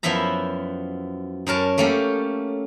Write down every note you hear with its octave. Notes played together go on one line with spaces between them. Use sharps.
F#2 F3 B3 E4 E5 A#5
F#2 C#4 A#4 A5
A3 A#3 C#4 G4 A4